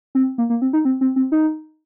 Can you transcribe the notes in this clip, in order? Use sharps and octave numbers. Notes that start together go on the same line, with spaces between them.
C4
A#3
A#3
C4
D#4
C4
C4
C4
D#4